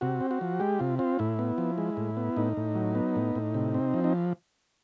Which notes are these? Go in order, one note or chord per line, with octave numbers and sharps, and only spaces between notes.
C3 F#4
C4
F#4
F3
G#3 G4
C3 F4
C4 F4
A2 E4
B3
F3
G#3
A2
B3
A2 D#4
A2
F#3
B3
A2
A2
C3
C4
F3
D#4